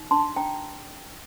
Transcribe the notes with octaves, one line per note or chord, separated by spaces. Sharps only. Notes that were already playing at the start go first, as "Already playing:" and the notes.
Already playing: D#4
D4 A5 C6
D4 G5 A#5